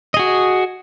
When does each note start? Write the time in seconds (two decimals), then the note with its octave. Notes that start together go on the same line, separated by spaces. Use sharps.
0.14 D#5
0.17 G#4
0.19 F#4